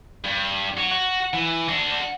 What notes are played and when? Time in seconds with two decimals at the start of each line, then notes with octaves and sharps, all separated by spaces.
0.24 G2
0.77 F#4 C#5
0.91 F#4
1.33 E3
1.68 D4 F#4